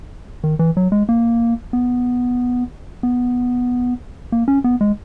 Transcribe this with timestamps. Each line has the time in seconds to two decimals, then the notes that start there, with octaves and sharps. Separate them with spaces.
0.43 D#3
0.59 E3
0.77 F#3
0.92 G#3
1.09 A#3
1.73 B3
3.03 B3
4.32 A#3
4.48 C#4
4.64 B3
4.81 G#3